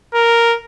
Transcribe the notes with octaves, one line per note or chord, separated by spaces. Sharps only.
A#4